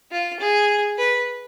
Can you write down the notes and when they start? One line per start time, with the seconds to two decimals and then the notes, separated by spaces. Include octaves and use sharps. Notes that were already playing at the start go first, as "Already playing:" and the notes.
0.12 F4
0.40 G#4
0.98 B4